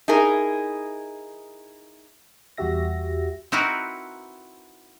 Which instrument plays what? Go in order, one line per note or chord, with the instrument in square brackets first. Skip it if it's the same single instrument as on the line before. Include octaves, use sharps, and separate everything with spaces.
[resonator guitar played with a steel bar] D#4 E4 G#4 A#4
[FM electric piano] E2 G3 F#4 G4 E5 A#6
[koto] C4 D#4 E4 F#4 A#4 B4